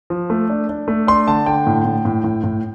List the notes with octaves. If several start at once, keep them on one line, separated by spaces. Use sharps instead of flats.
F3
A3
D4
D4
A3
D4 C6
D3 A5
D3 G5
A2
A2
A2
A2
A2